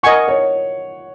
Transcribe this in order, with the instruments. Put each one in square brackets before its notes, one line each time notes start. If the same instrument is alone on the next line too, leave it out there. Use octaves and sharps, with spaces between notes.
[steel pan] A#4 D#5 G#5 C#6 [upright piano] F#5
[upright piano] C#5